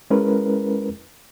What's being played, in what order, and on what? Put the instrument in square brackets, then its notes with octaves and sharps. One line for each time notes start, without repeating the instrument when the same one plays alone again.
[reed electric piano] G#3 C#4 E4 A#4 B4